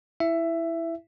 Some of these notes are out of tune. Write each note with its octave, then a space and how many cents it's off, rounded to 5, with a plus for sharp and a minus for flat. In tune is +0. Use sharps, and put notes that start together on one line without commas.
E4 +0 E5 +15